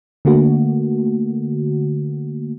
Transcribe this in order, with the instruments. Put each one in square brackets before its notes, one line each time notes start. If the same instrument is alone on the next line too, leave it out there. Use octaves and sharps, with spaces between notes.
[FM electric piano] D3 A3 A#3 F#4